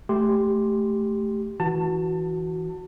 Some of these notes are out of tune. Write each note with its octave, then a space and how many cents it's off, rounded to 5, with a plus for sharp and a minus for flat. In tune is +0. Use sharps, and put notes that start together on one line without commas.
A3 -10 G4 +0 C6 +0
E3 -20 F#4 +0 A5 +25